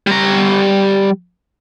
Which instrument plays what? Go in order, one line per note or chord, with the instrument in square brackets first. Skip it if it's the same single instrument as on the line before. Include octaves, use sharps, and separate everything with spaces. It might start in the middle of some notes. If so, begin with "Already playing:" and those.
[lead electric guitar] G3 A#5